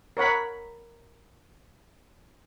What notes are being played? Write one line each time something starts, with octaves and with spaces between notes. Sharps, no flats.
A#4 C#5 F#5 B5